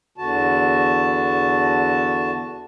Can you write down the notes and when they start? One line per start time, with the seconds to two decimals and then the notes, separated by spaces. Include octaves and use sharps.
0.18 E2 D3 F#4 A5